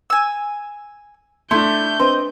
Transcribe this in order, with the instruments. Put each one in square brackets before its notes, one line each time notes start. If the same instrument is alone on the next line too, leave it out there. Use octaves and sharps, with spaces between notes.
[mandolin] G#5 E6
[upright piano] A3 D4 [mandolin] E4 [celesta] C6 [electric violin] G6
[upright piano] C4 [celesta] D4 B4 C6 [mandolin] D#5